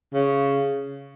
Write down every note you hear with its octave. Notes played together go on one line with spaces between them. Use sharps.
C#3